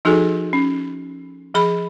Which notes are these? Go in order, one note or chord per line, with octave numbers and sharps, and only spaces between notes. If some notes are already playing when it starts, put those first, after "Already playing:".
F3 D#4 F#4 G#4 A4 G#5
C#4
F3 G#4 B5